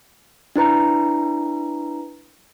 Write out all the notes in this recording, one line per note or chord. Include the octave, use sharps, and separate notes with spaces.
D4 E4 B4 A#5